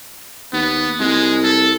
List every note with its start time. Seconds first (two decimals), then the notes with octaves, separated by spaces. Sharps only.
0.53 D#2 B3
1.00 C2 G#3
1.44 A4